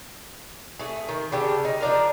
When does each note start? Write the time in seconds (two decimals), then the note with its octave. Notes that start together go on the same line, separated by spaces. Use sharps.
0.80 A3 G#4
1.09 D#3
1.32 C#3 D4 G4 A4
1.65 D#4
1.80 F3 D4 A#4